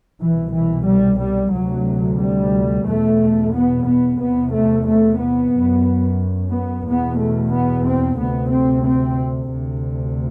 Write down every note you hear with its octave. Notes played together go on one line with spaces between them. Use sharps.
C2 B2 E3
E3
G3
G3
D2 C3 F#3
G3
E2 B2 A3
B3
B3
E2 C3 B3
A3
A3
B3
F#2
B3
E2 B2 B3
A3
B3
C4
D2 C3 B3
C4
C4
D2 C3